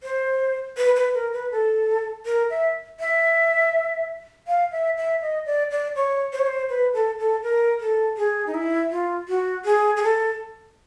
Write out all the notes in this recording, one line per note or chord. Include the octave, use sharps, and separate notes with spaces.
C5
B4
B4
A#4
B4
A4
A#4
E5
E5
F5
E5
E5
D#5
D5
D5
C#5
C5
C#5
C5
B4
A4
A4
A#4
A4
G#4
D#4
E4
F4
F#4
G#4
G#4
A4